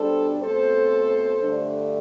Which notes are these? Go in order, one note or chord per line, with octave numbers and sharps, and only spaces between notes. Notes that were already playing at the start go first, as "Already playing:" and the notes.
Already playing: B2 G3 D4 A4 C5
B2 A3 C4 A4 C5
G2 D3 A3 D4